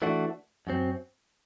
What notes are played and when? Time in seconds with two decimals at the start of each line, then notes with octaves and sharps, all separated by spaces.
0.02 E3 A3 D4 F#4
0.67 F#2 F#3 C4